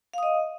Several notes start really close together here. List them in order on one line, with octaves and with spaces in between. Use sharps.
F5 D#6 D#5